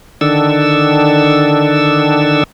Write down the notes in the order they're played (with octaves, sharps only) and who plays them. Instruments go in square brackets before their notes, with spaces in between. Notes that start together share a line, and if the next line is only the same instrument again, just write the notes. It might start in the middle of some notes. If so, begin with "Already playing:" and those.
[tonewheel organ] D3 D#3 D4 A4 E6